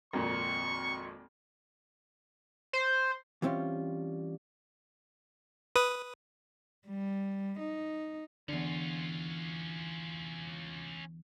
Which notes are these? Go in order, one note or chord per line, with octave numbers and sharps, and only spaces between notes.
G#1 F2 A#2 C#6
C5
E3 G3 C4 C#4 F4
B4 D#6
G3
D#4
E2 D3 C#4 F4